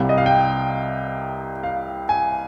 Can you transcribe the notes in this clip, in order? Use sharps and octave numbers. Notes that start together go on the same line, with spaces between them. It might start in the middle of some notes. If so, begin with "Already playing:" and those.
Already playing: C2 C3 G3 F5
D#5
F5
G5
F5
G#5